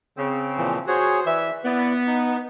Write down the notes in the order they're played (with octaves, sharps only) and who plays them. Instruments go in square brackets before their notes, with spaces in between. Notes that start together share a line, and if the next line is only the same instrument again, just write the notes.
[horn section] C#3 C4
[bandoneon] A#2 E3 F3
[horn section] F#4 C5 [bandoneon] G#4 C#5
[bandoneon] E3 [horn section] B4 D5 E5
[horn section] B3 [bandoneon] E4 D5
[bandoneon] D#4